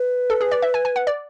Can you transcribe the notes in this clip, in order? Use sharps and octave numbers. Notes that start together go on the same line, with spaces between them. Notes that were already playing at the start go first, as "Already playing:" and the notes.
Already playing: B4
A4
G#4
D5
E5
G#5
G#5
F#5
D5